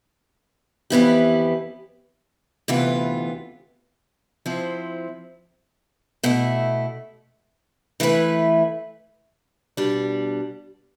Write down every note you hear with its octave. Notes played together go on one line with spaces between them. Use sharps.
F2 E3 B3 E4 G4
D2 C3 E3 B3 F4
F3 C4 E4
B2 A3 E4
E3 A3 E4 B4
B2 G3 D4